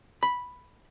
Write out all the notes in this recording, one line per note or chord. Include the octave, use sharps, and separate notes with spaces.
B5